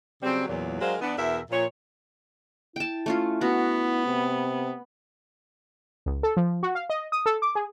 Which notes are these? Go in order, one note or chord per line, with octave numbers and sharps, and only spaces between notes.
C#3 F#3 G3 C4
E2 A#2 F#3
F#3 G#3 D4 A#4 C5 F5
E3 B3 D4
E2 B2 E4 A#4 E5
A#2 F3 C#5
E4 G5 A5
A3 C#4 F4
B3 F#4
C3
C#2
A4
F3
F#4
F5
D#5
D#6
A4
D6
G#4